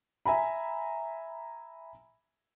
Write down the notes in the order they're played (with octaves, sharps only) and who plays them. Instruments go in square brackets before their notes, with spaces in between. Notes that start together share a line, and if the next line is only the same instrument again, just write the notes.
[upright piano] E5 G#5 A#5 B5